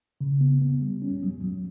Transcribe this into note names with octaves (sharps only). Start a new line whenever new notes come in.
C#3
B3
B3
G3
C#4
F#3
F#3